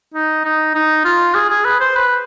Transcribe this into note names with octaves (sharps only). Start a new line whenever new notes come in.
D#4
D#4
D#4
F4
G#4
G#4
B4
C5
B4